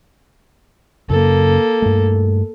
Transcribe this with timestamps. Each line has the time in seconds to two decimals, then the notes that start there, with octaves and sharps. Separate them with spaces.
1.09 F#2 C#3 A#3 A4
1.82 G2 A3